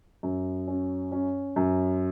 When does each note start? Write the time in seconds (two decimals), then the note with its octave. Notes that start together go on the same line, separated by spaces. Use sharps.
0.23 F#2
0.67 C#4
1.12 C#4
1.56 F#2